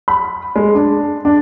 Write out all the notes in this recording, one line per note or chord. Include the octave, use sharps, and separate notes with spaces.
B5
G#3
D4
D4